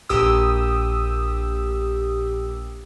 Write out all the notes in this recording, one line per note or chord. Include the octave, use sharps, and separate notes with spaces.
A#1 G4 D#6 E6